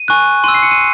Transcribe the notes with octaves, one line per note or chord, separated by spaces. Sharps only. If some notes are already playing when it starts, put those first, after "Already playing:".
Already playing: D#7
G#5 C#6 F#6
C6 E6 D#7
C7
C#7
D#7